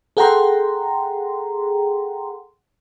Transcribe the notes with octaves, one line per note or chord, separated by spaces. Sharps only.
G#4 A4 F#5 G5 A#5 C6